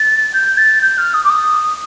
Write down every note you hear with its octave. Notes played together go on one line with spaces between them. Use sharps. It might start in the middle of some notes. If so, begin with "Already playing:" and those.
Already playing: A6
G6
A6
G6
F6
D#6
D6
D#6